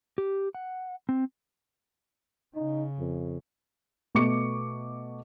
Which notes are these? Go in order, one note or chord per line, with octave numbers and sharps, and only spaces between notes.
G4
F#5
C4
C#3 D#4
F2
B2 A3 B3 C#6 D6 C#7